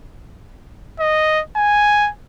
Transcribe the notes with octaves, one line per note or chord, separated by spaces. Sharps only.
D#5
G#5